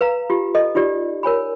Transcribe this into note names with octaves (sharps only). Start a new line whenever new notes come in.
B4 F5 A#5
F4 G4
A4 D#5
D#4 F4 G4 D5
A#4 C#5 G#5 B5